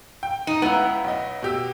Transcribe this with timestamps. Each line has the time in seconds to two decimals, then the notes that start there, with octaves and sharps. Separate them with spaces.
0.23 G5
0.47 D#4 D#7
0.62 C#2 B3 E4 A#5
1.04 B1 D#5
1.42 B2 G4 E6